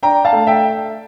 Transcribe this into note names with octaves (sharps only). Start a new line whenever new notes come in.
D4 G5 A#5
F5 A5
A3
E5 G5